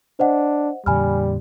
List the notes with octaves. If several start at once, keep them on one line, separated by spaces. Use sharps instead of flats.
D4 C5 D#5 F#5
F2 A#2 D3 G3 G#5 B5 F6